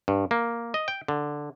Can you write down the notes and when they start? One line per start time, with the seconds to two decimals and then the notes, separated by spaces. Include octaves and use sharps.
0.08 G2
0.31 A#3
0.74 D#5
0.88 G5
1.08 D3